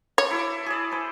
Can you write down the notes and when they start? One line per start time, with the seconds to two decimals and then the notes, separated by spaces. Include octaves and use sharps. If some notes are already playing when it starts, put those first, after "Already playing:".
0.18 C#5
0.30 E4 A4 D6
0.66 G#4 D5
0.91 A4 C5